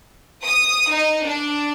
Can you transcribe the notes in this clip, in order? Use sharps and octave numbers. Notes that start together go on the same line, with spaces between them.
D#6
D#4
D4